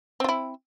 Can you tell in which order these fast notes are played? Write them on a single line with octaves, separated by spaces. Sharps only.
C4 F4 E4